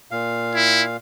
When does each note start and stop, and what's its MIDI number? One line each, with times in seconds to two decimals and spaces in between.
0.11 0.97 46
0.11 0.97 77
0.55 0.83 64